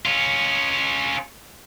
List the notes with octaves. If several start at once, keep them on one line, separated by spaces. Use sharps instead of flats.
C#4 F4